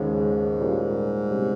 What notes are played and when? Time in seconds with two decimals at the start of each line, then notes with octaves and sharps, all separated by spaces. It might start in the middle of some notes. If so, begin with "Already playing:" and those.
Already playing: D#2 G#2 C#3 G#3
0.59 A#2 G3 A#3 C#4 F4
1.31 C3 G3 C#4